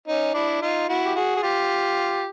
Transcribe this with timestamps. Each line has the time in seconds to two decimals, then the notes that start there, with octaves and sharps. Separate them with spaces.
0.08 C#4 D#4
0.34 D4 E4
0.62 D#4 F4
0.89 E4 F#4
1.05 G4
1.16 F#4 G#4
1.36 G#4
1.42 F4 G4